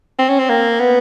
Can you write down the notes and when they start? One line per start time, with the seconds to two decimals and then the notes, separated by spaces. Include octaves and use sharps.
0.19 C4
0.29 C#4
0.39 C4
0.49 A#3
0.80 B3